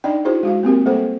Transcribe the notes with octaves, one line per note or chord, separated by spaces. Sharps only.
D4 D#4 D5 D#5 G5
E4 F#4 G#4 C5
G#3 F#4 F5
A#3 C4 G4 A#4
G3 A3 A#3 A4 C5